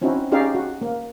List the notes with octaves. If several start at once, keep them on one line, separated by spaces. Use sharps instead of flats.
C4 C#4 D#4 E4 F#4
C#4 D#4 G4 G#4 D5 F5
F#4
A#3